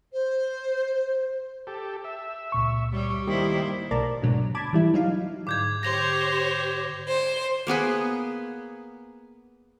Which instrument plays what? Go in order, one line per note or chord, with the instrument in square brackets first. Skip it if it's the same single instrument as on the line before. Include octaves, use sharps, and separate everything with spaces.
[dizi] C5
[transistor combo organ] G4 A4
E5
[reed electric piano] C#2 A#2 C#6
[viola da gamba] G3 G4 [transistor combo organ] C#5
[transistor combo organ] D#3 G3 [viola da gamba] A#3 E4 C5 [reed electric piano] G4
[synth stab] B1 A#3 D5 A5 A#5
G#2 B2 D3 F#3
A5 B5 D6 G#6
E3 G3 E4
F#3 D#4 F5
[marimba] G#2 D3 [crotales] D6 G6 G#6
[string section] G4 C5 C#5 [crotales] A#6 F7
[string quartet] C5
[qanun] A#3 B3 G#4 B4